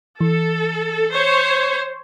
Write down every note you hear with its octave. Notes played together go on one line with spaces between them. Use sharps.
E3 A4
C5 C#5